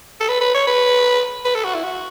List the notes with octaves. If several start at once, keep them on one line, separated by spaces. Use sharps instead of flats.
A4
B4
B4
C#5
B4
B4
A4
F#4
E4
F#4